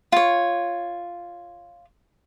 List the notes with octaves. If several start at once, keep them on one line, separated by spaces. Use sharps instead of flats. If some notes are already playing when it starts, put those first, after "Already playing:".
F4 C#5